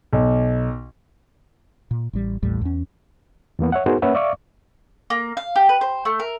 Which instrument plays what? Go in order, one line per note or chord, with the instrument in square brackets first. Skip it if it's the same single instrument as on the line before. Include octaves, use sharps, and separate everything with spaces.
[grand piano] B1
[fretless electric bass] A#2
A1 G3
A1 D#2 A2 G3
E2 C#4
[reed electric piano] E2 E3 A#3 B3
C#5 E5 F#5
B3 D#4 F#4 G#4 A#4 C5
A#3 C#4 B4 C#5 E5 F#5
D5 E5 F5 C#6 D6
[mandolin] A#3
F5
G4
B4
C5
A3
A#4